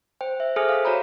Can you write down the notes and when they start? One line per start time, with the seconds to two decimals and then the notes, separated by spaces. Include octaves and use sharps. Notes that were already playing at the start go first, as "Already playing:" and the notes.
0.21 C5 G5
0.40 E5
0.56 G#4 A4 C5 G#5 D#6 F6
0.69 F5 D#6
0.85 F#4 C#5 A#5 B5